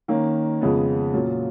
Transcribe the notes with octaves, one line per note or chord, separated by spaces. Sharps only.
D#3 A#3 C#4
F2 C#3 G#3 B3
A#2 F#3 C#4 F4